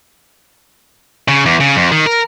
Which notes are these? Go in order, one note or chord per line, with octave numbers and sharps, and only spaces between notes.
C#3
E2
C#3
F2
D#3
A#4